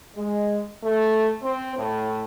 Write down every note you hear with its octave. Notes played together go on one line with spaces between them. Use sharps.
G#3
A3
C4
A2